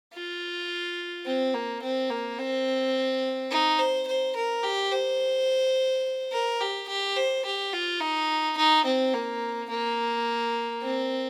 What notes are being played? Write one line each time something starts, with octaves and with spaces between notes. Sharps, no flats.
F4
C4
A#3
C4
A#3
C4
D#4
C5
C5
A#4
G4
C5
A#4
G4
G4
C5
G4
F4
D#4
D#4
C4
A#3
A#3
C4